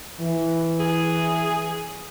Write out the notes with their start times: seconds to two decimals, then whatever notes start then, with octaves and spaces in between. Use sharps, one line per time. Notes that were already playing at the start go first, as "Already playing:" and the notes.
0.20 E3
0.79 G#4